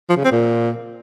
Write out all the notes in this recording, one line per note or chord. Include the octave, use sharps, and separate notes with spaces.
F3
C#3
C4
A#2